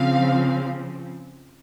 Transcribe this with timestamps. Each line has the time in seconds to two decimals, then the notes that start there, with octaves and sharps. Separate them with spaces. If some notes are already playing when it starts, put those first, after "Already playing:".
Already playing: C#3 F3 C4 F5